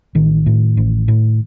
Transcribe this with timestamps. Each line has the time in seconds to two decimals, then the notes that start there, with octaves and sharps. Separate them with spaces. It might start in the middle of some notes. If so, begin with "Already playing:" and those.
0.15 A1 D#3
0.46 A2
0.77 A1
1.08 A2